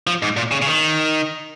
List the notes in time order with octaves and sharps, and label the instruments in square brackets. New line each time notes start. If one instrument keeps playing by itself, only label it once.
[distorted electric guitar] F3
G#2
A#2
C#3
C#3
D#3